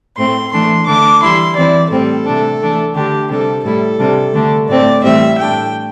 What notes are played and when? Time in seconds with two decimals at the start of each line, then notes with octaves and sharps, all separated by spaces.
0.17 A2 A3 C4 C6
0.52 E3 A3 D4 C6
0.86 D3 A3 D4 D6
1.21 E3 G3 E4 C6
1.56 E3 C4 E4 D5
1.90 A2 G3 C4 A4
2.26 C3 A3 D4
2.60 E3 A3 D4
2.95 D3 A3 D4 G4
3.30 C3 G3 D4 A4
3.64 A2 G3 E4 A4
3.98 C3 G3 D4
4.33 D3 A3 D4
4.67 A2 A3 C4 D5
5.03 A2 E3 G3 C4 E5
5.38 A2 A3 D4 G5